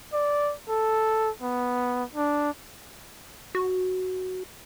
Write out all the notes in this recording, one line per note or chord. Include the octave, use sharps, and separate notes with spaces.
D5
A4
B3
D4
F#4